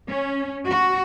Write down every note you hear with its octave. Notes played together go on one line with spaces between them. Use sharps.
C#4
F#4